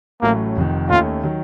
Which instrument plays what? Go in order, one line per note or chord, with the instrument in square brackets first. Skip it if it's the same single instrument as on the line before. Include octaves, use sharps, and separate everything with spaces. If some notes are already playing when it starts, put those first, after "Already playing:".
[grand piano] A1 A2 F#3 A3 C#4 [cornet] A#3
[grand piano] F1 F2 D#3
[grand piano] D#2 D#3 A3 C#4 [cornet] F4
[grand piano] D#3 F#3